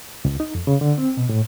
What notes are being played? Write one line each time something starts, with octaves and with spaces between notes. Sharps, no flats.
C#2
D#4
F2
C#3
D3
C4
B2
A2